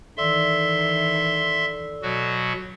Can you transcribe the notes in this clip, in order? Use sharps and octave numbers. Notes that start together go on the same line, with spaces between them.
D#3 E3 A4 D5 E5 C6 E6
B2 F#3 F#4